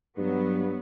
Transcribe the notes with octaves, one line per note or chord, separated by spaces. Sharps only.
G2 F#3 B3